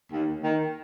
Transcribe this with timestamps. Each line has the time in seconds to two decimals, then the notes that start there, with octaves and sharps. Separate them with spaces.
0.11 D#2
0.44 D#3